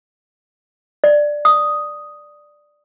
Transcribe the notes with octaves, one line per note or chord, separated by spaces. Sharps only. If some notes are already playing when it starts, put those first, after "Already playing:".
D5
D#6